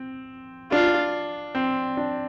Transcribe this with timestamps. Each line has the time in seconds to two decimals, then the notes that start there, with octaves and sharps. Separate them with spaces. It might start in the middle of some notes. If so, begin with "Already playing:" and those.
Already playing: C4
0.72 D4 F4
1.55 C4
1.97 D4